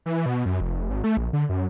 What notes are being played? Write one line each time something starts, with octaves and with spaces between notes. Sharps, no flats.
E3
B2
F#2
F1
G#1
A3
A#1
D3
F#2